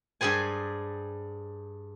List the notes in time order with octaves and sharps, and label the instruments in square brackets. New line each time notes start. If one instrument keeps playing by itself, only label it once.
[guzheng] G2 G3 G#4 C5 G#5